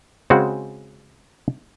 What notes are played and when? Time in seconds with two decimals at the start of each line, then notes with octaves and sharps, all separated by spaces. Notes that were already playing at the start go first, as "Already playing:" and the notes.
0.30 C#3 G#3 C4 F#4